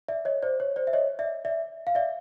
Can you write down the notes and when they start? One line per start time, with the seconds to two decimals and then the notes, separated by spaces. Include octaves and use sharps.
0.08 D5 E5
0.25 C#5 D#5
0.43 C5 D5
0.60 C#5
0.76 C5 D5
0.87 E5
0.93 C#5 D#5
1.19 D5 E5
1.45 D5 E5
1.87 F5
1.95 D5 E5